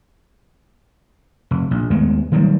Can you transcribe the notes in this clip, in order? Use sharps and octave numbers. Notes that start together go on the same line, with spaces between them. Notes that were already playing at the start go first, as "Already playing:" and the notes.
F1
A#1
D#2 G#3 A3 B3
D#3 F#3 G3 A#3